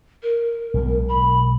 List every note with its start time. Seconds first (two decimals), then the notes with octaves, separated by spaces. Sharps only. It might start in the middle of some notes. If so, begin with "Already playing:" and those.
0.22 A#4
0.74 B1 B2 G#3
1.08 B5